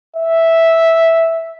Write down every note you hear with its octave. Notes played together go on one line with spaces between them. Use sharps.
E5